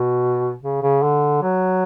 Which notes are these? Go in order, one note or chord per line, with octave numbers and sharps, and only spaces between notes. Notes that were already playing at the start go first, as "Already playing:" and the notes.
Already playing: B2
C#3
C#3
D3
F#3